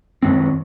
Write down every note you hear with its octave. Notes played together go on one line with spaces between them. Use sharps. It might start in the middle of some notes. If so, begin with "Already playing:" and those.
F#2 D#3 G#3 C4